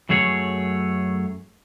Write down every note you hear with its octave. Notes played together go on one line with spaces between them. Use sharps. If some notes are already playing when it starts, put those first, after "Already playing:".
F#2 F#3 A3 G#4 C#5